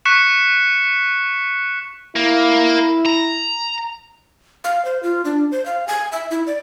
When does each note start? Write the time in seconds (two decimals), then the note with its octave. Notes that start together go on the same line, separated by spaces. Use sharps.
0.05 C#6 F#6 B6 C#7 E7
2.16 A#3 E4
3.06 A#5
4.64 F5
4.85 C5
5.03 F4
5.25 D4
5.52 C5
5.66 F5
5.87 G#5
6.12 E5
6.31 E4
6.47 D5